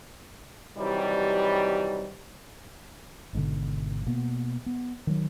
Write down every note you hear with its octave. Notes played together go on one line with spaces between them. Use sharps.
C3 D#3 E3 F#3 G3
G#1 G#2 B2 D3
B2 A#3 B3
B3
D#3 F#3